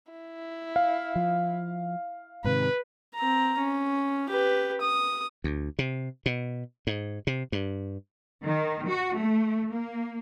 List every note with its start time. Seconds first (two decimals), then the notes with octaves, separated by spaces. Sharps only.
0.11 E4
0.76 F5
1.16 F3
2.44 G#2 C3 D#3 B4
3.15 C4 A#5
3.58 C#4
4.30 G4 B4
4.81 D#6
5.44 D2
5.79 C3
6.26 B2
6.87 G#2
7.27 C3
7.52 G2
8.44 D#3
8.88 F#4
9.17 A3
9.70 A#3